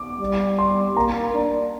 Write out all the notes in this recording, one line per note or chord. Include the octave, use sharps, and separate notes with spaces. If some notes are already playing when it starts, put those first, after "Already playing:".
Already playing: D6
G3
C6
A#3 A#5
D4